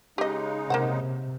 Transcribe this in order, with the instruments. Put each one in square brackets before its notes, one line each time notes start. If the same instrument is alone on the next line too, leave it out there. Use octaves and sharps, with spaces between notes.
[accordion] C#3 G#3 D#4 [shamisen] G4 D#5
[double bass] C3 [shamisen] A#3 C5 F#5